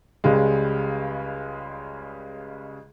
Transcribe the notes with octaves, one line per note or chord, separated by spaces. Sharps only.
C#2 C#3 G3 G#3